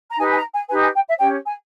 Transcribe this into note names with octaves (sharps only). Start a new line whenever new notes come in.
A#5
D#4 G4 B4 G#5
G#5
A#5
G#5
D#4 G4 B4 G#5
G#5
G5
E5
C#4 G4 C#5 G5
G#5